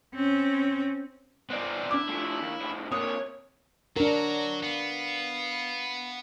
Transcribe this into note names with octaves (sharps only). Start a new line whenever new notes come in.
C4 C#4
B3 C4 D#4 D5
D4 E4 D6
F3 A3
D#2
F2 A2
C3 A#3 C#5 D#6 F#6
F#3 D4 F#4 A#4 A#5
B3 F5